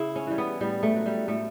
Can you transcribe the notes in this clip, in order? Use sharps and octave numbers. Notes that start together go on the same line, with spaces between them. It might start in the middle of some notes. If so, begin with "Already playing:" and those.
Already playing: C#3 E4
C#4
E3 G3
B3
A2 G3
A3
F#3
G3
A2 A3